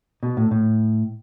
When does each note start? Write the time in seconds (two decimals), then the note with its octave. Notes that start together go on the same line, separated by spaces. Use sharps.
0.23 B2
0.37 A2
0.51 A2